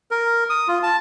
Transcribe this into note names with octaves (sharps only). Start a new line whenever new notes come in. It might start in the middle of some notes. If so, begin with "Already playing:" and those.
A#4
D#6
F4
A5